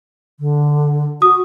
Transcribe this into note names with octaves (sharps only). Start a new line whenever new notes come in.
D3
F#4 D#6